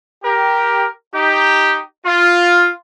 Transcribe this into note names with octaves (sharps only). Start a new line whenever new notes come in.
G4 A#4
D#4 G4
F4